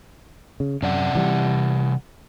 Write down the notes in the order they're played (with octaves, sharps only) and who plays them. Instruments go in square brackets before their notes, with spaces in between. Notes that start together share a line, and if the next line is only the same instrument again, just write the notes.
[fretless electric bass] C#3
[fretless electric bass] F#2 [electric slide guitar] C3 D5 F#5
[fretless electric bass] E3 G3